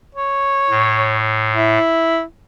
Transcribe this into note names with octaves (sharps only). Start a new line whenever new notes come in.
C#5
A2
E4